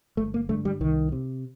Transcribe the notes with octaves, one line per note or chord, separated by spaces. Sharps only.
G1 A3
A#3
G2 D3 A3
G3
C2 D#3
C3